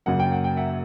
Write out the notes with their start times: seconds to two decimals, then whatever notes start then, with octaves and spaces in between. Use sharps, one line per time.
0.06 F#2 C#3 F#3 A#3 F#5
0.20 G5
0.32 F#5
0.44 G5
0.57 E5 F#5